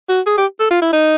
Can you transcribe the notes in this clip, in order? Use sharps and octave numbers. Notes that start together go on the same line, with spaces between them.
F#4
G#4
G4
A4
F4
E4
D#4